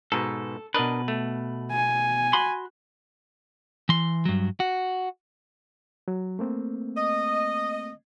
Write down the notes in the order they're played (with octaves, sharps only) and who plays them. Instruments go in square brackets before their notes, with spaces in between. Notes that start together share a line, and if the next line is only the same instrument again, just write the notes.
[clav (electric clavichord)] G#2 B2 [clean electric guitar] A4
[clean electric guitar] B2 B4 [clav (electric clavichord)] D4 A#4 D#5
[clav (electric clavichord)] A3
[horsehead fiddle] G#5
[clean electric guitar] F#4 B5 C6
E3 C6
G2 F#3
F#4
[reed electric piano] F#3
A3 A#3 C4
[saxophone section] D#5